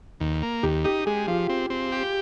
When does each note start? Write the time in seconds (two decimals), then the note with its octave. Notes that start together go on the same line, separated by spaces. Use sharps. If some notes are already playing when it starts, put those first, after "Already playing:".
0.20 D#2
0.43 A#3
0.63 D#2 G4
0.85 D#4 G4
1.06 G#3 G#4
1.27 F3 F4
1.49 C4
1.70 C4
1.92 G4